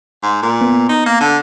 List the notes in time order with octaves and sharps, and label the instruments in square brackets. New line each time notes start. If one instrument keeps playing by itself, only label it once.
[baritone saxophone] G#2
A#2
[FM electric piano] B3
[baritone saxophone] D#4
A#3
D3